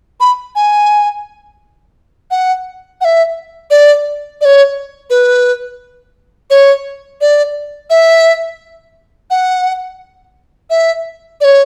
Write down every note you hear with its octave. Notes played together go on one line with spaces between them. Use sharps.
B5
G#5
F#5
F#5
E5
D5
D5
C#5
B4
C#5
D5
E5
F#5
E5
D5
C#5